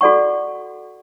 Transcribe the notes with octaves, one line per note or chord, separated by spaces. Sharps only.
F#4 A4 D5 F#5 C#6